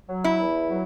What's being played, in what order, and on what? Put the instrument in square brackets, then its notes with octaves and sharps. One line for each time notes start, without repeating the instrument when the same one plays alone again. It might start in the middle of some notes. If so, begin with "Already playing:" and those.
[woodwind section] F#3
[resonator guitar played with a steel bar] E4
[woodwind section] E2
F#3